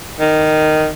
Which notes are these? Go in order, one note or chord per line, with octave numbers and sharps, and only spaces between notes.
D#3